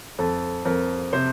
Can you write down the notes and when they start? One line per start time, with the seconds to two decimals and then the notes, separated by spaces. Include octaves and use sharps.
0.19 F2 A4
0.65 F2 A#4
1.13 C3 C5